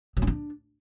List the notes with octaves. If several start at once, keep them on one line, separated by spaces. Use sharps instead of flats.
F#3
C#4
D4